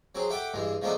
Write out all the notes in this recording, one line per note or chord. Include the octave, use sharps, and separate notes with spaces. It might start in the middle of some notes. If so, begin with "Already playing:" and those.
F#3 C4 G#4
G4 A4 E5 F#5 G5 D6
G2 E3 G#3
F3 G#3 A3 B3 D4 D#4